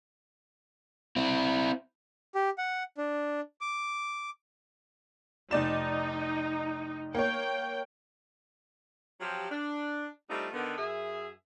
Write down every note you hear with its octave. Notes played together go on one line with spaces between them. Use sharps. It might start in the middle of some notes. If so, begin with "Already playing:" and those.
C4 E4
G4
F#5
D4
D6
F1 D#4 D5 E7
A#3 C#5 G5
F3 F#3 C4 F4 G4
D4
G3 A3 C4 D4 D#4 F4
D3 D#3 B3
F#2 G#4 E5